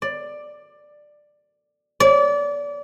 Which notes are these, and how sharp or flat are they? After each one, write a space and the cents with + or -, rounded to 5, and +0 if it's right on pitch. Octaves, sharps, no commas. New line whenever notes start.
D5 +10
D5 -30